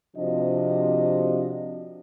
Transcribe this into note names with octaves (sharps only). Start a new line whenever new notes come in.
C3 F3 D4 F#4 D#5